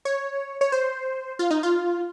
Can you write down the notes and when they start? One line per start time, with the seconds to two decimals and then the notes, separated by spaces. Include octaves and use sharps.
0.05 C#5
0.61 C#5
0.72 C5
1.39 F4
1.51 D#4
1.63 F4